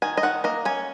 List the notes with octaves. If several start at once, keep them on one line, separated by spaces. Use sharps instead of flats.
D#3 G#5
D#5
D#3 F#5
A#3 D#5
C#4 G#5